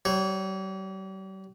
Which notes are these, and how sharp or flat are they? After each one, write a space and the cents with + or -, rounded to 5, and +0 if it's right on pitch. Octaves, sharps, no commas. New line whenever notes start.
G3 -40 C#5 -20